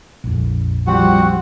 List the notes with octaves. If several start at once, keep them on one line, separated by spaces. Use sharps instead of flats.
A#1 F2
F3 G3 C4 F#4 F#5